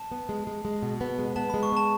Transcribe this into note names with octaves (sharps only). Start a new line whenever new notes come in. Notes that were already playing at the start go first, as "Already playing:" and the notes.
Already playing: A5
B3
G#3
G#3
G#3
B2
B3
G#3
B3 A5
G#3 B5
C#6
B3 A5